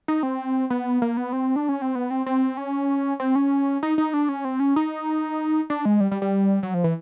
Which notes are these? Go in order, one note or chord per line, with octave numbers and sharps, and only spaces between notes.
D#4
C4
B3
A#3
B3
C4
D4
C#4
C4
B3
C4
C4
C#4
C4
C#4
D#4
D#4
D4
C#4
C4
C#4
D#4
D4
G#3
G3
G3
G3
F#3
F3
E3